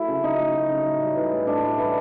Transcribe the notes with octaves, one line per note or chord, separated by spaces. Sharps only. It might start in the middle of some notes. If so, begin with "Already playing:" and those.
Already playing: F#3 A3 E4
C#3
C#3 D#4
A3
F#3
C#3
A2
G3
E3
A2
A2 D4
G3
E3